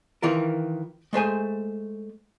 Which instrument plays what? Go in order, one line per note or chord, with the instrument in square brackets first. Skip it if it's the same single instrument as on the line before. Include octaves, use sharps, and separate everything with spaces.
[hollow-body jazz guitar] D#3 E3 F4 A#4
G#3 A3 C5 G#5